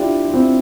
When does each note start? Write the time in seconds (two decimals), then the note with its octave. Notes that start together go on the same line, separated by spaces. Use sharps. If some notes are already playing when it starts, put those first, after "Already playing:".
Already playing: D4 E4 F4 G4
0.28 F4
0.34 C4 E4